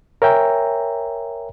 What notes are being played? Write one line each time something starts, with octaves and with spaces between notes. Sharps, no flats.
A#4 C#5 E5 G5 G#5 A#5